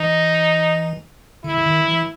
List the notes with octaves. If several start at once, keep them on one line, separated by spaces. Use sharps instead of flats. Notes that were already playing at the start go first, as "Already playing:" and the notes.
Already playing: E3 D#4
D3 E4
D3
D#3
E3